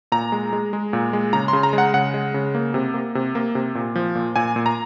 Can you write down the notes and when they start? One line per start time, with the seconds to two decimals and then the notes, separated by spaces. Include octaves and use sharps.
0.12 A#2 A#5
0.32 G#3
0.53 G#3
0.73 G#3
0.93 A#2
1.13 G#3
1.33 C#3 A#5
1.48 C#3 C6
1.63 A#5
1.73 G#3
1.78 F#5
1.94 C#3 F#5
2.14 G#3
2.34 C#3
2.55 A#3
2.74 C3
2.94 A#3
3.15 C3
3.35 A#3
3.55 C3
3.75 A#2
3.95 F3
4.15 A#2
4.36 A#2 G#5
4.56 A#2
4.66 A#5